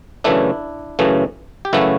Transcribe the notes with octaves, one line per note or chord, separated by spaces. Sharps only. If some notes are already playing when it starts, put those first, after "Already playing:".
F#2 C#3 E3 A3 D4 E4
F#2 C#3 E3 A3
G4
F#2 C#3 E3 A3 E4 F#4